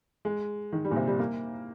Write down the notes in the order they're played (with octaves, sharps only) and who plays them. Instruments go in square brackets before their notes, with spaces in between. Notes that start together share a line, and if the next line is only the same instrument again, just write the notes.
[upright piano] G#3
D#3
G3
A#2
C3
G3
A#3